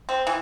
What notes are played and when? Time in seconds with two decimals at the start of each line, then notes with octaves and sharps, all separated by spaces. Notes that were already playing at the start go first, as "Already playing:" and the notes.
0.09 C4
0.27 E3